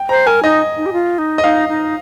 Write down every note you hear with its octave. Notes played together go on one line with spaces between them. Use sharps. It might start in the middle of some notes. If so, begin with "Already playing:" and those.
Already playing: G5
C5 A#5
A#4 G#5
D#4 D#5
D#4
G4
F4
D#4
D#5
D#4 F5
D#4